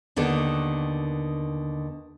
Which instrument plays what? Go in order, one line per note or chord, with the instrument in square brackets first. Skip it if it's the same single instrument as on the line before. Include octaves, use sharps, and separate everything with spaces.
[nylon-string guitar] D#2 D3 D#3 B3